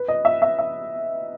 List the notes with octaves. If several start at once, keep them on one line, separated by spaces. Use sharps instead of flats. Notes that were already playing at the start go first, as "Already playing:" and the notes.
Already playing: B4
D#5
E5
E5
E5